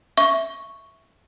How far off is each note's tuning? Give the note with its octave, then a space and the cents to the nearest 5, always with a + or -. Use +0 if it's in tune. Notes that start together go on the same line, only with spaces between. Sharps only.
E5 +0 C#6 +0